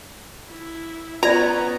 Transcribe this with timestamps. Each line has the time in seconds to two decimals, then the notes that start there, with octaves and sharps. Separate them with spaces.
0.49 E4
1.23 B3 C#4 F4 D5 A#5